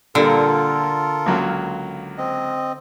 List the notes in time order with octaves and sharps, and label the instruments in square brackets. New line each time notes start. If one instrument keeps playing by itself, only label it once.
[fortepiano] A#2 G3 A#3 [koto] D3 [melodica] F4 A4 A#4
[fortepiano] C#2 F#3 A#3
[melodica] C4 D#5